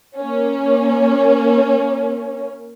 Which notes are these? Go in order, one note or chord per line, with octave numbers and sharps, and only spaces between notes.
A#3 C#4